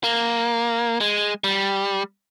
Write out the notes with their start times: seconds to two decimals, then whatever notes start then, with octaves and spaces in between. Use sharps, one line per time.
0.04 A#3
1.01 G#3
1.44 G3